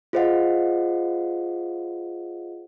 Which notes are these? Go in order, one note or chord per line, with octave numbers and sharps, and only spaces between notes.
F4 G#4 C5 D#5 F5 F#5